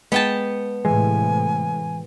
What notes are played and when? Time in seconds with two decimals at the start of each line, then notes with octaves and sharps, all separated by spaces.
0.12 G#3 B3 G5 A5
0.85 A2 C3 E3 G#3 G#5